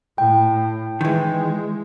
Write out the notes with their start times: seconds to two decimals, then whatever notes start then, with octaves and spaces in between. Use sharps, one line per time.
0.18 A2 G5
1.01 D#3 E3 G#3